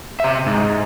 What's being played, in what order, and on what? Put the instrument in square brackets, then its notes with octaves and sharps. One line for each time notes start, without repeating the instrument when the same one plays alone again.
[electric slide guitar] C3 E5
G#2